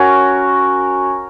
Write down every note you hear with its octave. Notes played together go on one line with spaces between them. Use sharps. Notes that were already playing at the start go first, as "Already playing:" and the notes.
Already playing: C#4 F#4 A#4 C#5